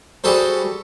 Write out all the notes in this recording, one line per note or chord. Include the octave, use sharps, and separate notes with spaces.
G3 F#4 G#4 A4 C5